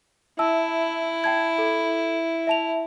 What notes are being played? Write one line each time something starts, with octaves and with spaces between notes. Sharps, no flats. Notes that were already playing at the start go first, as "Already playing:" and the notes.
E4 E5 A5 E6
G5 A5 G#6
A4
E5 A5 F7